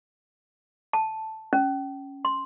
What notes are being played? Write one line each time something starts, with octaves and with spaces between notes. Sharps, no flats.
A5
C#4
C6